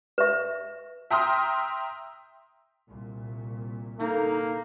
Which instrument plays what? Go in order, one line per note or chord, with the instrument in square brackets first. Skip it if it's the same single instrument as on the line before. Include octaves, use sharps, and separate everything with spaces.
[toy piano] B4 E5
[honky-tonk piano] E5 G5 A#5 C6 D#6 F6
[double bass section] C2 A#2
[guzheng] D3 E4 [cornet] A#3 [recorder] D#4